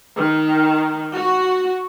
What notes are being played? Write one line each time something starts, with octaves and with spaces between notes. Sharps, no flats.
D#3
F#4